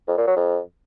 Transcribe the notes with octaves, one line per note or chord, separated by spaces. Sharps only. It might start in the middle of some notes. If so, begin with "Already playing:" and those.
F2
A#2
F#3
F2